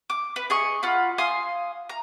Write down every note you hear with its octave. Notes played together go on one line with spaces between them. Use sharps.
D6
B4
G#4 D#5 C#6
F4 F#5 B5
F5 G#5 C6 D#6
A#5